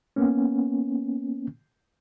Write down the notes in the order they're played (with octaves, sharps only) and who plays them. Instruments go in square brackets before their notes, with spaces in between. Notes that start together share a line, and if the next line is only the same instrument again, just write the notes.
[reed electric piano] A#3 B3 C#4